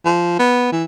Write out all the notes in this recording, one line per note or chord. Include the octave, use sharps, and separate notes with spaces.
F3
B3
E3